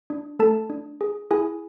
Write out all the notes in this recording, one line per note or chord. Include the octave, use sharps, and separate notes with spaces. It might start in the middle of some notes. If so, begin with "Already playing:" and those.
D4
A3 A4 A5
D4
G#4
E4 G#4 G#5